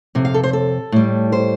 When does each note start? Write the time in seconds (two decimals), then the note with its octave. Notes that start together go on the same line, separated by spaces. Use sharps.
0.15 F2 C3
0.25 F5
0.34 A4
0.43 C5
0.53 A4
0.92 A2 G3
1.32 C5